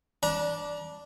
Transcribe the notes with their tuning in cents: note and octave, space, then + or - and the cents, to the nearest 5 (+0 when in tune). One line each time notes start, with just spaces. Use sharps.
D4 -5 A#5 +40